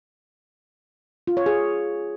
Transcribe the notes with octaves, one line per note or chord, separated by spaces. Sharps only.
F4
C#5
G#4